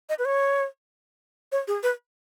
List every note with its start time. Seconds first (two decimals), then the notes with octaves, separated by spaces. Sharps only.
0.09 D#5
0.19 B4
0.25 C#5
1.52 C#5
1.67 G#4
1.83 B4